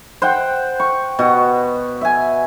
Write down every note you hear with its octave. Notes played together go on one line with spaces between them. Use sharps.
C5 F#5 G5
C#6
B2 F#4
E5 G#5